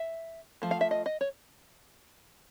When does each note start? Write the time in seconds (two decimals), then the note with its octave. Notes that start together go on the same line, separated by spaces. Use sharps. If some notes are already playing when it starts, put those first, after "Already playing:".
Already playing: E5
0.62 F3 A3
0.71 F5
0.81 E5
0.91 D#5
1.06 D#5
1.21 C#5